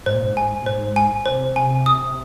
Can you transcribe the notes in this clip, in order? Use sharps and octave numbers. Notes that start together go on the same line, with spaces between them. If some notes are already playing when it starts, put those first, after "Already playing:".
G#2 C5
A#2
G#2
G#5
A#2
G#2 C5
G#5
C3 C5
G#5
D#6